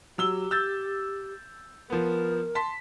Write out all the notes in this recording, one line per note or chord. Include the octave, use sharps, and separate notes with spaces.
F#3 G4 E6 G7
E6 G6 A6
F3 B3 A#4
A5 C6 B6